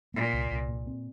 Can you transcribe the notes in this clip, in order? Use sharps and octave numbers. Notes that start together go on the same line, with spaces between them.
A#2 A#3
C2
C2
A#2
C4